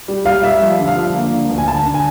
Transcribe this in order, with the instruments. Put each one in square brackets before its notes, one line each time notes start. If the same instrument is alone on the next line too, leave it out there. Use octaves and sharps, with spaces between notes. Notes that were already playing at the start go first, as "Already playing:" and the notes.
[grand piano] G3
G3 F5
G3 E5
F3
D3
F5
F3
A#3
D3
D2
G#5
D3 A5
D3
G#5